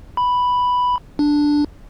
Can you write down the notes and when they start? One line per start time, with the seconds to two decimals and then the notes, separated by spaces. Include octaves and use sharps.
0.17 B5
1.19 D4